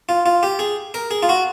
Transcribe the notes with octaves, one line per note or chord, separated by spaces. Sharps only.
F4
F4
G4
G#4
A#4
G#4
F4
F#4